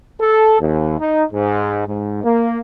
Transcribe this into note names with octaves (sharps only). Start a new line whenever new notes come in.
A4
D#2
D#4
G#2
G#2
A#3